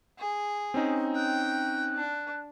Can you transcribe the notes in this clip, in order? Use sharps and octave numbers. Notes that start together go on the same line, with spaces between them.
G#4
C4 C#4 D#4
G5 F#6
D4